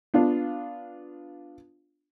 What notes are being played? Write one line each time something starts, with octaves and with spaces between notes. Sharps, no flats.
B3 D4 F4